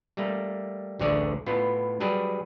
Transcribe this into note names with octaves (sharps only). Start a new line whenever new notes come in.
G3 A3 A#3
A1 D2 D3 G#4 C#5 D5
A2 B3 F4
F#3 G3 G4 G#4 B4